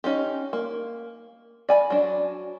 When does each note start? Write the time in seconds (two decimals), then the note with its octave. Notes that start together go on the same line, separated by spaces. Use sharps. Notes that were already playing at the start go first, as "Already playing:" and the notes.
0.04 C#4 D#4 G4
0.53 A#3
1.69 D5 G#5 B5
1.90 F#3 D4